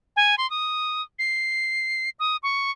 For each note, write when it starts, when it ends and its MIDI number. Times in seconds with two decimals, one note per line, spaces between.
0.16 0.35 80
0.38 0.49 84
0.50 1.02 87
1.19 2.10 96
2.19 2.37 87
2.43 2.71 85